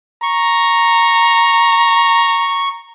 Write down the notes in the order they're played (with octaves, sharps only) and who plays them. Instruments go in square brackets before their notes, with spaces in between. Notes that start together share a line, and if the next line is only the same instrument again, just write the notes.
[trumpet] A#5 [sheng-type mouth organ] C#6